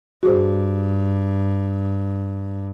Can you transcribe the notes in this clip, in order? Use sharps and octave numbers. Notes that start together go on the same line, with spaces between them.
G2 F#4 G#4 C5